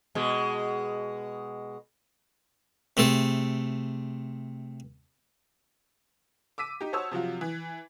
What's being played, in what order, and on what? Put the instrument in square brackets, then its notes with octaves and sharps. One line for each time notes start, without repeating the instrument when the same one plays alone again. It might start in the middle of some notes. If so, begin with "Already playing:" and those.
[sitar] B2 G#3
[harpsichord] C3 A3 G#4 A4
[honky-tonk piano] D6 E6 B6 D#7
D#4 G4
F#4 C5 C#5 A5 D#6 E6
C3 F3 F#3 F4
E3